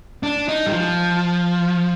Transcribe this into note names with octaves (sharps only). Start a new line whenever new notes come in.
D4
D#4
G3
F3